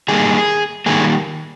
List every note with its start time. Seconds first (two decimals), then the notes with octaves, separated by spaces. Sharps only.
0.08 D#3 G3 A#3 G#4
0.86 D#3 G3 A#3 G#4